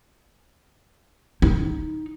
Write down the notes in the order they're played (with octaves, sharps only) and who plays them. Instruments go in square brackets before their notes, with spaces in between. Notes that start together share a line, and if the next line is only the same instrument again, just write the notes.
[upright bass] D#4